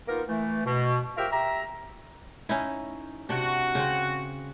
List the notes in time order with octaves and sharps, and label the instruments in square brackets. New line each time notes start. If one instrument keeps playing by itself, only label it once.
[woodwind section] A#3 B3 D#4 F4 A#4
E3 A3
B2
F4 G4 A#4 C5 E5
G4 E5 A#5
[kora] C#4 D#4 E4
[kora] C3 D4 [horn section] F#4
[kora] C#3 C4